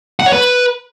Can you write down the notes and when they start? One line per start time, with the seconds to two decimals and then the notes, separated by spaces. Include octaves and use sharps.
0.20 F#5
0.26 C#5
0.33 B4